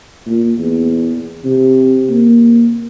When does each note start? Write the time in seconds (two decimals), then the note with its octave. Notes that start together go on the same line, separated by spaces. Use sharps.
0.27 A#2
0.59 E2
1.44 C3
2.10 A#3